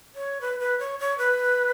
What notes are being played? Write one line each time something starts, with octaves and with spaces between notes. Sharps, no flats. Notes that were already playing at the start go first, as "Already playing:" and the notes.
C#5
B4
B4
C#5
C#5
B4